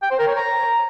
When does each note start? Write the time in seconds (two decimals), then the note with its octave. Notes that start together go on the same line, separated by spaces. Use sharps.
0.03 G5
0.11 C5
0.19 A#4
0.27 C#5
0.35 A#5